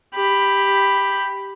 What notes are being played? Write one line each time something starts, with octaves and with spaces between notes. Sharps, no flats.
G4 B5